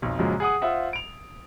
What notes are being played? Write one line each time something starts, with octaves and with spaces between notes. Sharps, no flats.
B1 F2
F#2 A#2 C#3 F3 F#3 G#3
G#4 F#5 D#6
F4 C5 E5 F#5
D7 F7